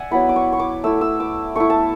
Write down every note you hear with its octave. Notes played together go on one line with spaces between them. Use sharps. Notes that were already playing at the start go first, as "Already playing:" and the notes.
Already playing: D5 E5 F#5 G#5
F#3 B3 E4 B5
D6
C#6
C#6
D6
A3 E4 E6
E6
D6
A3 E4 C#6
A5